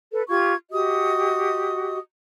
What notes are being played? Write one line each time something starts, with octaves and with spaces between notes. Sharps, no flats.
A4 B4
F4 G4 C#6 G#6
F#4 G4 D#5 D#6